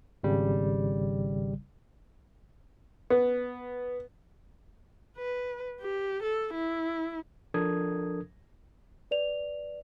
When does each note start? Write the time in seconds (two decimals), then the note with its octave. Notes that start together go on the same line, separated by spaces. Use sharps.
0.23 G#1 C#3 G3
3.10 B3
5.17 B4
5.81 G4
6.23 A4
6.54 E4
7.54 F3 D4 A4 A#4 D#6 G#6
9.11 B4 D5 F7